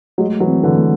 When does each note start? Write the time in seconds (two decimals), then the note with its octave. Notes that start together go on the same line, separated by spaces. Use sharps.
0.18 F#3 G#3 A3
0.40 E3 F#3
0.48 C4
0.63 D3 E3
0.78 A3